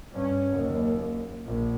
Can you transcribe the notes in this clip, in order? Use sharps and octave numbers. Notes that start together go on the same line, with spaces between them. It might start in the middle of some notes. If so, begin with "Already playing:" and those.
G2 C#4
F#1 D#2
A#1